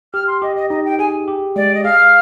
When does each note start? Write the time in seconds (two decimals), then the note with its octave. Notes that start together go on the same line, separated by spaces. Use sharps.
0.14 G4 F6
0.27 C6
0.42 G4 D#5
0.56 D#5
0.70 D#4 D#5
0.85 G5
0.99 G#4 G#5
1.28 G4
1.56 G#3 D5
1.75 D#5
1.84 G#4 F5